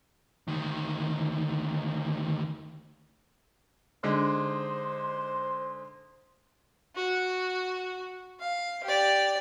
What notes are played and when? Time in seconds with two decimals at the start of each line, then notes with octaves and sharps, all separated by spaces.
0.48 D2 D#3
4.04 D3 G#3 D#4 C5
6.96 F#4
8.40 F5
8.84 G4 D5